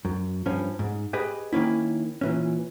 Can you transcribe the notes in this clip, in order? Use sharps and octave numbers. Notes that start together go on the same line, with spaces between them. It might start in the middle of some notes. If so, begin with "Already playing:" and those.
F#2
G2 F3 C#4
G#2
G4 G#4 B4 D#5
D#3 A#3 C#4 E4
A#2 E3 C#4